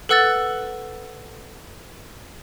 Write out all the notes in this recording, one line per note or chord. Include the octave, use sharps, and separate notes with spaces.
A4 B4 F#5 E6 F#6 A6